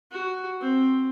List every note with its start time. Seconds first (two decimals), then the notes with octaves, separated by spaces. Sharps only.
0.12 F#4
0.61 C4